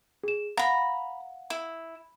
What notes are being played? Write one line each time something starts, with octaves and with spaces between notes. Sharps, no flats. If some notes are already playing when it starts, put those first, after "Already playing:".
G#4 E7
F5 F#5 A#5 B5
E4